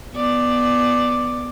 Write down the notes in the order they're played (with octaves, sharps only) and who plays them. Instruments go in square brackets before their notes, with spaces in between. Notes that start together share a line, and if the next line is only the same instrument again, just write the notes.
[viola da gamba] B3 D5